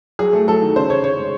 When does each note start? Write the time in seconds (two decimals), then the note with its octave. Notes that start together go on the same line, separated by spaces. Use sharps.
0.19 F#3 G#4
0.33 A3
0.48 F#3 A4
0.62 D#3
0.75 C#3 C5
0.90 C#3 C#5
1.04 C#3 C#5
1.17 G#3